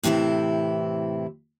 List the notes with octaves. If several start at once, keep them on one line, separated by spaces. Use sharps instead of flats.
A2 C3 E3 C4 E4